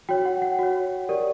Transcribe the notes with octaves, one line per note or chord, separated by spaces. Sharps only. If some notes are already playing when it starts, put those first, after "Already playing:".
F#4 C#5 G5
F#5
F#5
F#4 C#5
G4 A#4 D5